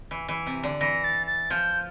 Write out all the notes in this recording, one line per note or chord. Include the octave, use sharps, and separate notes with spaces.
E3
E3
C3
D3
E3 A#6
A6
A6
F3 G6